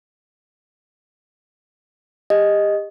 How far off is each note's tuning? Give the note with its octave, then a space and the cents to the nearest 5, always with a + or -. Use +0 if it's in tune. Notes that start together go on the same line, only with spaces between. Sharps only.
G4 +35 D#5 +0